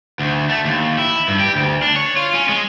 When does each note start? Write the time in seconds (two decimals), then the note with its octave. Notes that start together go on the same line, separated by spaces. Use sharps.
0.19 D2
0.50 A3
0.65 D#2
0.99 E4
1.28 G2
1.40 G4
1.56 D2
1.82 D4
1.96 C#5
2.17 F4
2.34 C#4
2.49 G#3